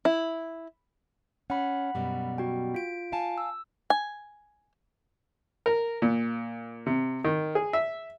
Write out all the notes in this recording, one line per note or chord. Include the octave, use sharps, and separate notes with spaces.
E4
C#4 F#5 B5
F#2 B2 G3
F#4 G5
F4 D7
F5 G#5 A5
E6
G#5
A#4
A#2
C3
D#3
G#4
E5